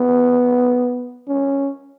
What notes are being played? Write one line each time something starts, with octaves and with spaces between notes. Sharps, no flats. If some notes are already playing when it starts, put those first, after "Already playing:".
Already playing: B3
C#4